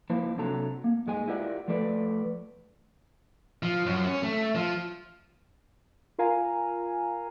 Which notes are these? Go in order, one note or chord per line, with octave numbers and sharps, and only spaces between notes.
F3 A#3 E4 C5 F5 A5
C3 F#3 D4 A4 A5 A#5
A#3
G#2 G#3 G#5
E4 F4 G4 A#4 D5 F#5
F3 A3 A4 B4 D5
F3
F#2
C#4
A3
F3
F4 A#4 F5 G#5 A#5